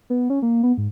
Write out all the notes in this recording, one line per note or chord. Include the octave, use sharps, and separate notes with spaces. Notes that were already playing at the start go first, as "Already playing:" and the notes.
B3
C#4
A#3
B3
G#2